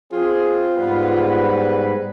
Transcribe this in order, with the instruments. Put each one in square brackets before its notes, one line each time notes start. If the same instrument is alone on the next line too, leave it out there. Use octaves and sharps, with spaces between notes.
[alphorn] C4 [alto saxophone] F4 [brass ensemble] G#4
[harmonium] G#2 [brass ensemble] G3 B4 [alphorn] B3